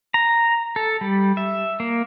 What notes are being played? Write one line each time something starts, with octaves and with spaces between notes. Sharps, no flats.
A#5
A4
G3
E5
A#3